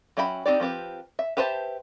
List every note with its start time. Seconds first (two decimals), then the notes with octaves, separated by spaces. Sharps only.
0.17 F#3 C#4 E5 G5 B5
0.46 C4 D#4 G4 D5
0.60 F3 C4 G4 B4
1.19 E5
1.37 G4 B4 C5 E5 A5